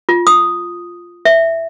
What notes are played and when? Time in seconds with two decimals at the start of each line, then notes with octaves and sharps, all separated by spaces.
0.09 F4
0.27 D#6
1.25 E5